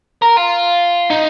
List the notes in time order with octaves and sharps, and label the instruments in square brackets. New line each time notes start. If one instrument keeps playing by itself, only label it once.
[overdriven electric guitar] A#4
F4
D#4